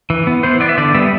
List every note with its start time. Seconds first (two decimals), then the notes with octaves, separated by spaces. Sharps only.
0.10 E3
0.27 B3
0.43 E3 C5
0.60 B3 D5
0.69 E5
0.78 D3 D5
0.94 G3 B3 E5